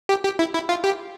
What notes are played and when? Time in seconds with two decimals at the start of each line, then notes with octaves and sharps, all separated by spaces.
0.09 G4
0.24 G4
0.39 E4
0.54 E4
0.69 F4
0.84 G4